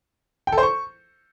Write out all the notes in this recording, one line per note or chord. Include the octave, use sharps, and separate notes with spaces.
G5
A4
C5
C#6